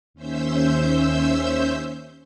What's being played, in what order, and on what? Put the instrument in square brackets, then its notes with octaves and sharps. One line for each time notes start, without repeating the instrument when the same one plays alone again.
[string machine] D#2 C#4 C5 E5 E6 G6